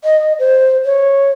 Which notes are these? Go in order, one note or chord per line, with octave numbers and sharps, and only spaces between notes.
D#5
C5
C#5